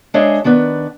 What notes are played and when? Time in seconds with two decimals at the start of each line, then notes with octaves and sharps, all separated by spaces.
0.14 G#3 D4 G#4 C#5 D#5 E5
0.44 D#3 B3 D4 B4